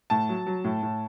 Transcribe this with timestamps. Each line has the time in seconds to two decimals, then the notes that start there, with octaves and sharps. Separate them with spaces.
0.10 A2 A5
0.29 F#3
0.46 F#3
0.64 A2
0.83 A2